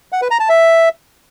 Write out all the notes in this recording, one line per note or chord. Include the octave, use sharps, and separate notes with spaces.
F#5
B4
A#5
A5
E5